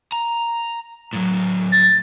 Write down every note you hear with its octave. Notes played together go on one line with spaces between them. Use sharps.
A#5
A2 F#3
A6